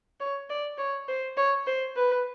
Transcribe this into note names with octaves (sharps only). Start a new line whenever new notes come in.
C#5
D5
C#5
C5
C#5
C5
B4